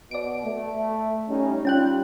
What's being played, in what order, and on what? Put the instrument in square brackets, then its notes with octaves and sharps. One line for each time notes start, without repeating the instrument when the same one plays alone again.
[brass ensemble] B2 [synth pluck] D5 D7
[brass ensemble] A3
G3 C#4 D#4
[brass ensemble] G3 F4 [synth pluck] C#4 G5 F#6